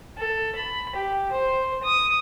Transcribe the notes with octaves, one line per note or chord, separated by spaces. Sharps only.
A4
B5
G4
C5
D#6